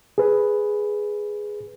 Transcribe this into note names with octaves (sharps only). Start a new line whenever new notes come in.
G#4 B4